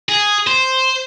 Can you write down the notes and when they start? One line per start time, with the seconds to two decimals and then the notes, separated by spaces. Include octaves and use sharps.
0.09 G#4
0.47 C5